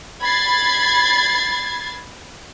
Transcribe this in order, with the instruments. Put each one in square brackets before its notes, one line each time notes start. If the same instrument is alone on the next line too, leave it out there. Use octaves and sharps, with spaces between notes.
[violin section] B5 G#6 A6 C7